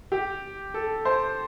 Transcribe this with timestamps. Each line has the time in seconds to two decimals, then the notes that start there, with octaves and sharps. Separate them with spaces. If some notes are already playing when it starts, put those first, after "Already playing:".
0.12 G4
0.74 A4
1.05 C5